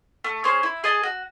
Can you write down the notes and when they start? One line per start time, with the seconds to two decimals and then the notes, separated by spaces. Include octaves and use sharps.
0.24 A3
0.44 C#4 G#4 C5
0.63 E4
0.84 G#4 D#5 A5
1.03 F#4